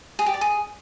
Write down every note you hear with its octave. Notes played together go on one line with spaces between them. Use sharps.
G#4
G4
D5
G#4